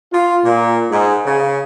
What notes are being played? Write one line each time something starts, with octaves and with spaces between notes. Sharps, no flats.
F4
A#2
G#2
C#3